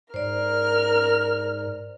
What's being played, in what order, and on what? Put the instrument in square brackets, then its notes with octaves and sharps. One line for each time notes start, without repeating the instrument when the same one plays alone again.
[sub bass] G#2 [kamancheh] A#4 F6 [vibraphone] C5 D5